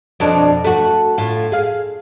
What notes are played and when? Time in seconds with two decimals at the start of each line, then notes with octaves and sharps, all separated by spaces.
0.20 F2 B2 D4
0.64 A3 F#4
1.18 A2 F4
1.52 G#4 F5